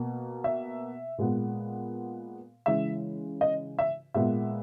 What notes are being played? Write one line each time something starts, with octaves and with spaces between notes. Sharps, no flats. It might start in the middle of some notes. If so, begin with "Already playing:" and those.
Already playing: B2 A#3
E5
A#2 G#3 B3
C#3 E3 G#3 E5
D#5
E5
A#2 G#3 B3 E5